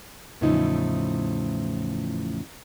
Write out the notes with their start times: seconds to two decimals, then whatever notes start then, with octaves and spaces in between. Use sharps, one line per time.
0.41 E2 A2 C#3 E3 F3 D#4